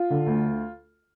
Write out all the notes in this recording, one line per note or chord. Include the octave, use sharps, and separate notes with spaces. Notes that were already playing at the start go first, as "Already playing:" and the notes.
Already playing: F4
D3
D2